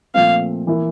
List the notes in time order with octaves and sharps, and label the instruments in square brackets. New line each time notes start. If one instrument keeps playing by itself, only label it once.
[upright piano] A#2 F3 A3 C4 [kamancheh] F5
[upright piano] E3 A#3 E4